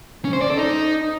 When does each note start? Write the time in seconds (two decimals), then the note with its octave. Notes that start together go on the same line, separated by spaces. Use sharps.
0.25 C#4
0.33 C5
0.41 D5
0.50 A4
0.58 D#4